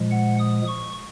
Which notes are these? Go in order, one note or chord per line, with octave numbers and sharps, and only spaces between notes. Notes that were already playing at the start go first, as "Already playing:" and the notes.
Already playing: A#2 F3 G#3
F#5
D#6
C#6